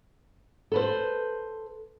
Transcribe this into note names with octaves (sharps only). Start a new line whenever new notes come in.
A4 B4 C5